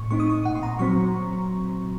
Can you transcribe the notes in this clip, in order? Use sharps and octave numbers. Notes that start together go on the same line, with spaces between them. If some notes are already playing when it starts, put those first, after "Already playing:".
Already playing: A2 C#6
A3 C4 D#4 C#6
D#6
C#6
A#2 F#5
C6
A#5
F#3 C4 C#6